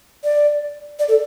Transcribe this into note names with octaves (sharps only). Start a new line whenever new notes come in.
D5
D5
A4